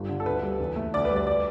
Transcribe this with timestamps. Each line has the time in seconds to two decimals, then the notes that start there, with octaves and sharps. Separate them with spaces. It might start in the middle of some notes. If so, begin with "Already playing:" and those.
Already playing: G1 G3
0.09 D3
0.20 A4
0.26 D2 B4
0.43 G3
0.60 E2
0.76 A3
0.94 D2 D5
1.05 B4
1.10 G3
1.16 D5
1.27 D5